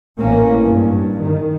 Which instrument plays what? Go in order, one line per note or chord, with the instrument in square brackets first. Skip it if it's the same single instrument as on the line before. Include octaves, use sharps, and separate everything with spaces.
[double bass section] A1 A#3 C#4
G2
D#3